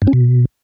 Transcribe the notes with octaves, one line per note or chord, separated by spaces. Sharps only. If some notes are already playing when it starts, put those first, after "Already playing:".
G2
C#4
B2